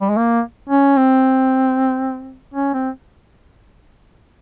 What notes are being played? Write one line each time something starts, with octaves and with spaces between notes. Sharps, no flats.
G3
G#3
A#3
C#4
C4
C#4
C4